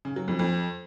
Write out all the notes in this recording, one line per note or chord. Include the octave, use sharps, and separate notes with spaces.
C#3
F#3
F2
F2